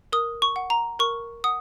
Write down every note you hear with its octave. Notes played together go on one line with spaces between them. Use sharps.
A#4 D#6
C#6
F#5
A#5
A#4 C#6
F#5 D#6